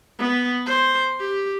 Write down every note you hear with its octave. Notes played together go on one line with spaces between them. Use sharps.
B3
C5
G4